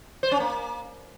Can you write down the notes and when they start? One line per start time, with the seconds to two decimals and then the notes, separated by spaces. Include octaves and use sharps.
0.23 C5
0.32 C#4
0.40 A#3